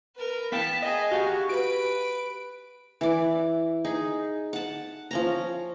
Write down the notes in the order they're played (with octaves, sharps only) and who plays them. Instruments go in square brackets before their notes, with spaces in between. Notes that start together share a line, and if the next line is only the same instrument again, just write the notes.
[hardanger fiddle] A#4 B4
[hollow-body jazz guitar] B3 F5 G5 [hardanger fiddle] A5 [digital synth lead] B6
[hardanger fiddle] G#4 [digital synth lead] D#5
[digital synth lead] F#4 [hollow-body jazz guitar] G4 D#5 F5
[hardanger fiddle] B4 [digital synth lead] D7
[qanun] E3 D5
D#4 G#4
F#5 A5
F3 C#4 A#5